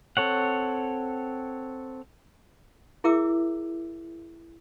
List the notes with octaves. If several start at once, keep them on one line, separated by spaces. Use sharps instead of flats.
C4 A4 C#5 F#5
E4 G#4 A#4 E5 D6 E6